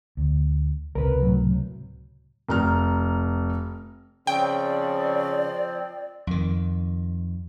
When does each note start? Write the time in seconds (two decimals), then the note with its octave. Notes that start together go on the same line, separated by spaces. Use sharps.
0.17 D2
0.95 C#2 C3 A#4 B4
1.21 A2 F#3
2.49 F1 A#5 F6
4.27 C#3 F3 C4 D5 G5
6.27 F2 D#3